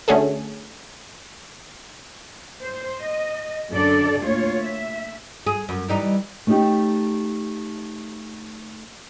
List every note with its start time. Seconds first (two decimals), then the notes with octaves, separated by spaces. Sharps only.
0.08 D3 A3 C#4 F#4 G#4 A4
2.62 C5
3.01 D#5
3.71 F#2 D3 A4 D5
4.22 D2 A#2 F4 C#5
4.63 E5
5.46 G#4
5.69 F#2
5.88 E3 G3 D#4
6.47 A3 C#4 D#4 G4